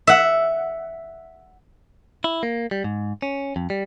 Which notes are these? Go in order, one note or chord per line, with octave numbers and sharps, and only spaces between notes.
E5 F#5
E4
A#3
G3
G#2
C#4
F2
G3